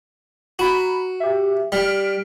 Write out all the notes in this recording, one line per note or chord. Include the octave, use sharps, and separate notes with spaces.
F#4 A#5 B5
G4 E5
G3 F6 B6 D7